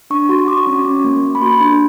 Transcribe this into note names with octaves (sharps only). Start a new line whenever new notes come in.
D4 C#6
F#4 C6
C#6
F#4 D6
C#6
C#4
C#4
A#3
A#3
B5
F#4 C6
D4